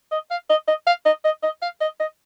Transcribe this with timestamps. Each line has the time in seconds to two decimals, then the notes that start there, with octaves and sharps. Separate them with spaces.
0.12 D#5
0.31 F5
0.50 D#5
0.68 D#5
0.87 F5
1.06 D#5
1.25 D#5
1.43 D#5
1.62 F5
1.81 D#5
2.00 D#5